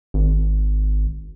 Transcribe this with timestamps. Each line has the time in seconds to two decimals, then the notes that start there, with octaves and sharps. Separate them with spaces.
0.14 G#1